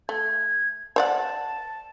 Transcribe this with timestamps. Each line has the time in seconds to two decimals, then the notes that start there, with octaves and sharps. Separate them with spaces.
0.09 A3 G#6
0.96 C5 D5 F#5 A5